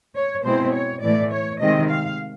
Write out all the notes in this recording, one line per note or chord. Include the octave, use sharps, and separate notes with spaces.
C#5
B2 G#3 C4 E4 C5
C#5
A2 E3 A3 D5
C#5
C3 D#3 G#3 C4 D#5
F5